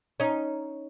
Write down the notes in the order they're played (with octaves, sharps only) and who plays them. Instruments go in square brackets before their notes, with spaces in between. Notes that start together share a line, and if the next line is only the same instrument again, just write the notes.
[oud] C#4 D#4